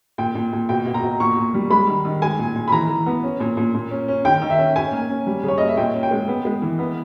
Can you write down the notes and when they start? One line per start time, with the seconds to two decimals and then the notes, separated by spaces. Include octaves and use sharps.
0.18 A#2 G5
0.35 A#2
0.53 A#2
0.69 B2 G5
0.86 B2
0.94 A#5
1.03 B2
1.20 A#2 C#6
1.37 A#2
1.54 G3
1.70 G#3 B5
1.88 D#3
2.05 D#3
2.22 G#3 G#5
2.39 A#2
2.55 A#2
2.68 B5
2.72 E3 A#5
2.89 E3
3.06 B3
3.23 C#4
3.40 A#2
3.57 A#2
3.74 A#2
3.91 C#4
4.08 C#4
4.25 D#3 G5
4.42 D#3
4.50 E5
4.58 C#4
4.76 C#4 G#5
4.92 A#3
5.09 C#4
5.27 G3
5.43 C#3
5.48 C#5
5.58 A#3 D#5
5.68 E5
5.77 A#2 G5
5.94 C#4
6.03 G5
6.11 G#3
6.28 B3
6.45 G#3
6.62 E3
6.79 B3